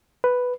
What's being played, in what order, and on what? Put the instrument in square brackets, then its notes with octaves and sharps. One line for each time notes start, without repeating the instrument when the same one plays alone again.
[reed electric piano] B4